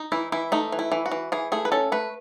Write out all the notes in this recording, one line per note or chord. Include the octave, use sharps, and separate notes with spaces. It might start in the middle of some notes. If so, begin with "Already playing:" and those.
Already playing: D#4
E3 E4
E3 E4
A3 D#4
E3
E4
E3
F#4
E3
E3 G#4
A3 G#4
B4
C#4 A4
A3 B4